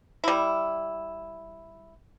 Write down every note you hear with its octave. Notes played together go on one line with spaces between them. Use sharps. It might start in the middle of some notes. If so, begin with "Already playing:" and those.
G3 E4